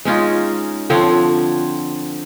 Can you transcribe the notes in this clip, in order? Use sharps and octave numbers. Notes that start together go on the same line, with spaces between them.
G#3 C#4 D#4 F4
D3 F3 C4 C#5